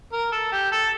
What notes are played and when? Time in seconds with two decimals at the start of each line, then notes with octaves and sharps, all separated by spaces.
0.13 A#4
0.32 A4
0.52 G4
0.72 A4